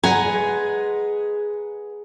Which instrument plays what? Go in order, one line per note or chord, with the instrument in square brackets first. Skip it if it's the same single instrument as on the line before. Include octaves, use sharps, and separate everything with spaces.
[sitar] G#3 [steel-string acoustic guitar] B4 F#5 [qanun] G#5 [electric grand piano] A#5